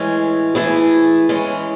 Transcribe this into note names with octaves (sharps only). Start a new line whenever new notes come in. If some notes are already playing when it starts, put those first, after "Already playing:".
Already playing: A2 E3 G#3 C#4
E3 A3 E4 G#4
E3 G#3 C#4